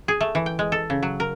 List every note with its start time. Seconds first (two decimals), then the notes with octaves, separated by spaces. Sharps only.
0.08 G#4
0.21 A3
0.35 E3
0.46 G5
0.59 G#3
0.72 A4
0.90 C#3
1.03 F#3
1.20 A#4